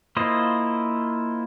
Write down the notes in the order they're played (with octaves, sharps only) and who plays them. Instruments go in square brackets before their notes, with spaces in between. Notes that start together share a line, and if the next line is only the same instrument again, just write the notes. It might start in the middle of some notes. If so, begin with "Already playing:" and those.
[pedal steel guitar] A#3 E4 F4 C5 D#5